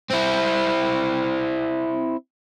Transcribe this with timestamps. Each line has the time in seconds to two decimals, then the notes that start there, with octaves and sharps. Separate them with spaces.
0.11 C4 E4